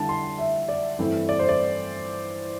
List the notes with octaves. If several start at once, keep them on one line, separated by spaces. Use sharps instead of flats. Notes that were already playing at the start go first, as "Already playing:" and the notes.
Already playing: D3 G3 E4 A5
C6
A5
E5
D5
G2 E3 A3 C4 E4
D5
C5
D5